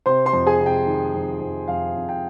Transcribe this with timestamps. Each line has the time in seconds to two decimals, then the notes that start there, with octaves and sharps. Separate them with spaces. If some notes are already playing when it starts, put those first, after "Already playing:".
0.06 C3 C5 C6
0.26 C5 C6
0.33 F2
0.47 G#4 G#5
0.60 C3
0.66 G5
0.86 D#3
1.14 F2
1.41 F2
1.68 F2 F5
1.95 F2
2.09 G5